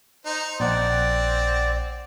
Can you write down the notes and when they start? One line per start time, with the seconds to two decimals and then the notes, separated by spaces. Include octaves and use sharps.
0.26 D#4 C5
0.60 A#1 C4 D5 F#5